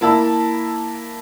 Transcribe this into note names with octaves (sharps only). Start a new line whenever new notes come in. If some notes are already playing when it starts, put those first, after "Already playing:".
A#3 E4 A5 B5 E6